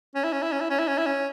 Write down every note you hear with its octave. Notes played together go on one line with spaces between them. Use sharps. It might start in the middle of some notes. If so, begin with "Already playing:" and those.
C#4
E4
C#4
E4
C#4
E4
C#4
E4
C#4
E4
C#4